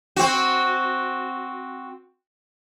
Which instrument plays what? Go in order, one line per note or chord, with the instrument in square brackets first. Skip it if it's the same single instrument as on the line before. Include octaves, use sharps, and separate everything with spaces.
[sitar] C4 F#4